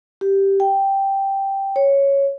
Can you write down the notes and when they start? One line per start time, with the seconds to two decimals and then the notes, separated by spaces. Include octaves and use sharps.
0.21 G4
0.60 G5
1.76 C#5